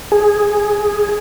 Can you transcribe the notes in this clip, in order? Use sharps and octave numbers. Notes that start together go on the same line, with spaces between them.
G#4